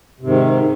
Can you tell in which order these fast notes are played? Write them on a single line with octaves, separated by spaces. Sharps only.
C3 G#2 D#3